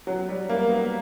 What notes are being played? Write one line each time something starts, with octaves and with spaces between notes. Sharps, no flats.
F#3
G3
A#3
B3